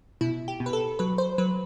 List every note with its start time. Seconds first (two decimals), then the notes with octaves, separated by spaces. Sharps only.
0.21 B2 E4
0.48 G4
0.60 B2
0.66 B4
0.73 A4
0.99 F#3 B4
1.18 C5
1.38 F#3 B4